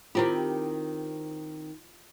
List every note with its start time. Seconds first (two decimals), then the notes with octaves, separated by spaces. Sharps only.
0.15 D#3 C4 E4 F4 G4